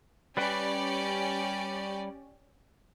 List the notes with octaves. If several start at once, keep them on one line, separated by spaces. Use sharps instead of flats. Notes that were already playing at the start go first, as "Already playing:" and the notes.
G3 C#4 G4 B4 D5 G5